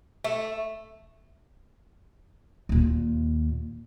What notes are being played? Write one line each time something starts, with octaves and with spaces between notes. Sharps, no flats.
A3
D#2 A#2